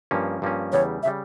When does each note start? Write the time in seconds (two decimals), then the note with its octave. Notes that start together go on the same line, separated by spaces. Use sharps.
0.11 G2 F3 A#3 C#4
0.42 G2 F3 A#3 C#4
0.72 E2 C#3 G3 C#5
1.03 C#3 G3 E5